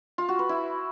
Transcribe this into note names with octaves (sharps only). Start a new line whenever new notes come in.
F4
F#4
B4
E4